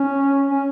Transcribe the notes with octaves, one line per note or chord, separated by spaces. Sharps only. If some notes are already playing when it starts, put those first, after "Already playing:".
Already playing: C#4
C#4